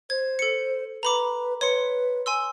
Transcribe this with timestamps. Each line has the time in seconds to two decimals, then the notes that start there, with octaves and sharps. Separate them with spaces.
0.10 C5 G#6
0.39 A4 C#7
1.03 B4 A#5 B5 D6
1.61 B4 C#5 C6 C#7
2.26 G#5 C6 E6